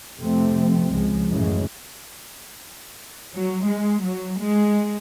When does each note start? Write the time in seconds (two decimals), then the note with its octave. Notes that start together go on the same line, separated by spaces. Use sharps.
0.18 F2 C3 F3 A3 C4
0.89 C#2 F3 G#3
1.30 F#2 A2 C#3 E3 G#3
3.36 F#3
3.66 G#3
4.04 F#3
4.39 G#3